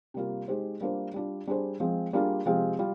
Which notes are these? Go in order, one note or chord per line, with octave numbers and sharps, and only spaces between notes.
C3 G3 A#3 F4
G#3 D#4 G4 C5
G3 A#3 D4 F4 C5
G3 D4 F4
G3 D4 G#4 C5
F3 G#3 C4
G3 A#3 D4 F4 G#4
C3 F3 G#3 C4 F4
G3 F4